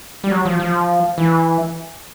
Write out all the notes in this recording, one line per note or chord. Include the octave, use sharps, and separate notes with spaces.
G3
F#3
F3
F3
E3